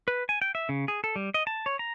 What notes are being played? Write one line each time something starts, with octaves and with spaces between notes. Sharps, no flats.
B4
G#5
G5
E5
C#3
G#4
A4
G3
D#5
A5
C#5
A#5